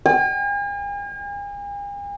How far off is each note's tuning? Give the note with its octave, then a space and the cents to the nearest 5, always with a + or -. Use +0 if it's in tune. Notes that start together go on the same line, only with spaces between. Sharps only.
G#5 -45